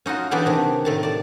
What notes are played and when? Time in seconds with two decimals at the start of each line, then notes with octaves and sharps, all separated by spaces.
0.06 C#4 D#4 F4 F#4
0.31 E3 F#3 B3 D4 G4 G#4
0.46 C3 D#3
0.85 A2 D#3 A5
1.03 D5 A5